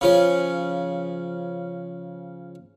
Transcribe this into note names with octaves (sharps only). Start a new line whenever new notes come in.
C#3 F3 C#4